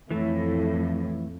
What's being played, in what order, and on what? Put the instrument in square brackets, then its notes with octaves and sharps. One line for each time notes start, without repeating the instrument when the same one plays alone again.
[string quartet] F2 [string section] A2 [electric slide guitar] E3 A3